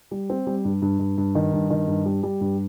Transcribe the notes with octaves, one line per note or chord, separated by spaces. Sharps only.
G3
C4
G3
G2
G2
G2
G2
D#3
G2
D#3
G2
G3
G3
G2